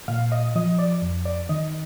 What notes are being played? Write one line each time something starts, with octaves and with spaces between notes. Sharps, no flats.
A#2 F5
D#5
F3 D#5
D5
F2
D5
D#3 D#5